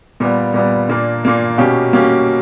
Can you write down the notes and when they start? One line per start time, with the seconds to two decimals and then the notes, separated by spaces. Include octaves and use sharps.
0.20 A#2 G3 B3
0.54 A#2 G3 B3
0.89 A#2 A#3 D4
1.24 A#2 A#3 D4
1.58 B2 A#3 C#4 G4
1.93 B2 A#3 C#4 G4